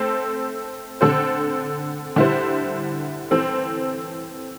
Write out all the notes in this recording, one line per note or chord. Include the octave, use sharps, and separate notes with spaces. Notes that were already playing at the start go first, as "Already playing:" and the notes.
Already playing: A3 C4 A4 C5
D3 C4 A4 C5
D3 G3 E4 C5
E3 C4 A4 C5